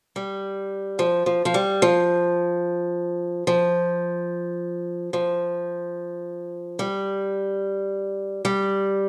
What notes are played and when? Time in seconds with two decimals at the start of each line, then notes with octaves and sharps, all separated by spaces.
0.16 G3
0.99 F3
1.26 F3
1.45 F3
1.54 G3
1.82 F3
3.47 F3
5.13 F3
6.79 G3
8.45 G3